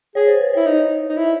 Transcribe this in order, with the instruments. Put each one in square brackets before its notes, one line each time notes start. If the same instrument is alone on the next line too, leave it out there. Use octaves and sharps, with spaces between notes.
[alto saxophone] G#4 [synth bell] C#5
[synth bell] C5
B4
[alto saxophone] E4 [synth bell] C#5
[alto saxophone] D#4
D#4
E4